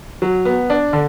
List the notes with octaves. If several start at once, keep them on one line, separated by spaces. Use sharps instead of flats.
F#3
B3
D4
D3